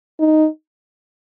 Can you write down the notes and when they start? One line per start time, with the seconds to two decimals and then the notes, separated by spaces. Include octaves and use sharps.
0.20 D#4